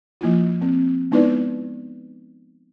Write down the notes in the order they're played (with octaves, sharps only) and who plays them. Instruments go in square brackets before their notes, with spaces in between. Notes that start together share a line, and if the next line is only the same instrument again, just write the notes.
[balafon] F3 A#3 E4 F4
C4
G#3 B3 D#4 E4 B4 D5